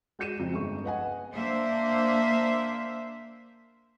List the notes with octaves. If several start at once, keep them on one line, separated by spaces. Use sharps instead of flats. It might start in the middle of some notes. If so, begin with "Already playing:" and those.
G#3 F#4 G6 C#7 D#7 E7
F2 C#3
G1 G#3 C#6
B4 D#5 F#5 G#5
A#3 D4 C5 E5